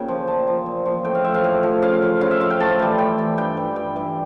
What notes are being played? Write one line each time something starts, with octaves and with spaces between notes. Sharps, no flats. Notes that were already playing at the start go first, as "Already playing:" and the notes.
Already playing: A#2 C#3 G5
F3
A#2 A5
F3
A#2
F3
A2 G5
F5
F3 E5
F5
A2
F3
C#3 F5
F3
C#3 F5
E5
F3 F5
G5
A2 A5
E3 G3
A2 G5
E3 G3
G2 G5
E3 G3
G2 G5
E3 G3